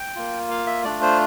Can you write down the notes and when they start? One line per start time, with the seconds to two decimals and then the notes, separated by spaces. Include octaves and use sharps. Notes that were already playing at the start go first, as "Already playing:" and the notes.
Already playing: G5
0.15 A#3 F4
0.50 F5
0.66 E5
0.84 A3 D4 F4 D5
1.02 C5